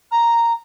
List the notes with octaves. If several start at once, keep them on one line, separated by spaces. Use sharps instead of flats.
A#5